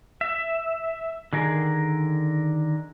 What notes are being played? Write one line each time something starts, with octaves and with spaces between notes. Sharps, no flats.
E5
D3 D#3 G#4 A#4